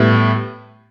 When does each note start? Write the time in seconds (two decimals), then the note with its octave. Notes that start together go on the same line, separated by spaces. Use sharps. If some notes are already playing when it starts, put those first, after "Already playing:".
Already playing: A2 G3 B3 E4